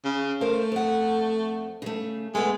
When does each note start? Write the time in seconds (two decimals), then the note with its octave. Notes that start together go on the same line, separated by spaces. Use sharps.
0.05 C#3
0.41 A3 A#4 C5 F5
0.72 F2 F#5
1.82 C#3 A3
2.35 G#3 A3 B3